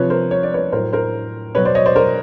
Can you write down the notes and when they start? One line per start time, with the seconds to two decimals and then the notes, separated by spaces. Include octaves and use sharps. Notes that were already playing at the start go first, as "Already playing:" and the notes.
Already playing: C3 F3 B4 C#5
0.10 A#4 C5
0.31 C#5
0.43 D5
0.54 B4 C#5
0.72 A2 F#3 A#4 C5
0.93 A#4 C5
1.55 B2 F#3 B4 C#5
1.65 C5 D5
1.75 C#5 D#5
1.86 C5 D5
1.96 A#4 C5